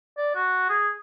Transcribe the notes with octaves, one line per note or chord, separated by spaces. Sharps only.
D5
F#4
G#4